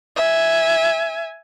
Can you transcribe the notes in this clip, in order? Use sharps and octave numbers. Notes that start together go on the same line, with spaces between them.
E5 G#5